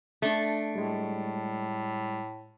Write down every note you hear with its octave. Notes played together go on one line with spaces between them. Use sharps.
A3 D4
A2 G3 G#3